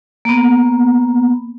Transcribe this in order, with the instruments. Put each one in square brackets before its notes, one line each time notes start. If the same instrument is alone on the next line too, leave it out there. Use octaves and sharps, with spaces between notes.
[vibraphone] A#3 B3